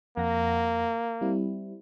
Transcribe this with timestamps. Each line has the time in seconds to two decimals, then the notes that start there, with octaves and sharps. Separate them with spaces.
0.17 F2 A#3 F#5 A#6
1.21 G3 C4 E4